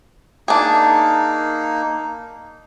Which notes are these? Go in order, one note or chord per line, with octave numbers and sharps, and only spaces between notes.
A#3 D4 D#4 G#4